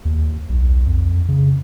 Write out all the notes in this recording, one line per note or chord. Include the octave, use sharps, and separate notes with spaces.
D#2
B1
F2
C#3